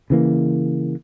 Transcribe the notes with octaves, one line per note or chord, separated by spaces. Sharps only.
C#3 E3 A#3